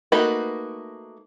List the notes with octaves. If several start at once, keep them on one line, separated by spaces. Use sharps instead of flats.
A3 A#3 D#4 F#4 B4